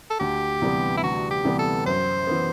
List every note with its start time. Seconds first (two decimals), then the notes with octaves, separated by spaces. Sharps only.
0.10 A4
0.20 D2 G4
0.62 C3 E3 G3 B3
0.97 E4
1.03 D2 F#4
1.31 G4
1.45 C3 E3 G3 B3
1.59 A4
1.86 F#2 C5
2.27 E3 B3